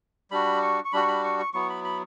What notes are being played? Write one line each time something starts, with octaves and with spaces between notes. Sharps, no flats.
G3 D4 F#4 B5
C#6
C#6
G3 D4 F#4 B5
C#6
B5
C#6
C#6
F#3 B3 E4 C#6
B5
B5